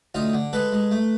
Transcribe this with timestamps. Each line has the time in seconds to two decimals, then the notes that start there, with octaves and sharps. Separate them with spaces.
0.14 D2 D#4 F4
0.33 D3
0.53 G#3 A4 B4
0.72 G#3
0.91 A3